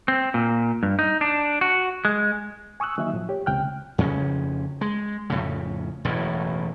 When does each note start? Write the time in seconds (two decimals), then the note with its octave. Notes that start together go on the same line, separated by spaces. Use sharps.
0.08 C4
0.34 A#2
0.83 G2
0.99 D#4
1.21 D4
1.61 F#4
2.05 G#3
2.80 G#5 C#6 D#6 E6 F#6
2.98 D#3 F#3 A#3 D#4 E5
3.13 A2 F3
3.29 G4 C#5
3.46 C#2 C3 G5 F6 F#6
3.98 F2 C#3 C#4
4.81 G#3
5.30 F2 A2 C#3
6.05 E1 A1 F#2 A2